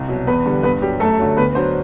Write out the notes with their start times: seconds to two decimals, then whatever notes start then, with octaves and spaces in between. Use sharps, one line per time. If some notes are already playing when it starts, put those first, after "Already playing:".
Already playing: C2
0.08 B2 F#3
0.27 E2 B3 B4
0.46 D3 G3
0.63 G2 B3 B4
0.82 F#3 G3 G4
1.00 F#2 A3 A4
1.19 D3 F#3
1.37 D2 B3 B4
1.55 D3 F#3 C5